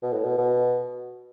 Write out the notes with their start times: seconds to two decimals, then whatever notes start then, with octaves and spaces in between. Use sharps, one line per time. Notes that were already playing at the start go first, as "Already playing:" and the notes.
0.03 B2
0.13 A2
0.24 B2
0.38 B2